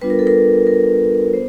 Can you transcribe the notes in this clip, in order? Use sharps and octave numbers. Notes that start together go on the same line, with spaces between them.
G3 B3 D4 F4 B4
A#4
A4
A#4
A#4
B3 C5